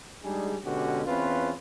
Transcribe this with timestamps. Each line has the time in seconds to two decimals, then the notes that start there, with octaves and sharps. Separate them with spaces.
0.23 G3 G#3 D4 D#4 G#4
0.64 B2 D3 G#3 C#4 F#4 G4
1.06 E2 C4 C#4 F4 B4